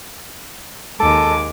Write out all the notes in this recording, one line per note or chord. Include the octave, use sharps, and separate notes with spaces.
D#2 G#3 A4 D6